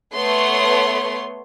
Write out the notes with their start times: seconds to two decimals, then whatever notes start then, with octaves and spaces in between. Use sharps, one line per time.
0.14 A3 B3 C#5 C6